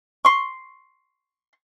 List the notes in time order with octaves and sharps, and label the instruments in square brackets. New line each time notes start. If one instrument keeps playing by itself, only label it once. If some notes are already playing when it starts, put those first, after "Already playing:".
[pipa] C6 C#6